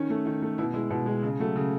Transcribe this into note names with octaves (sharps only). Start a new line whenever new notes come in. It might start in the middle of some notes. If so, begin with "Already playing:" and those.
Already playing: D#3 C#4
A3
D#3
A3
B2 E4
G#3 E4
B2
G#3
C#3
F#3 A3
C#3